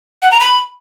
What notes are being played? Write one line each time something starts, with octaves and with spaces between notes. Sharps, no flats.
F#5
A#5
B5